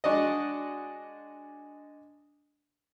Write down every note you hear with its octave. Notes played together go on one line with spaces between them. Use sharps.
G#3 D4 F#4 D5 D#5